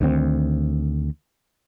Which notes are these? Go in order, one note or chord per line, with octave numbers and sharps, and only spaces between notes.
D2 D#3 B3 C4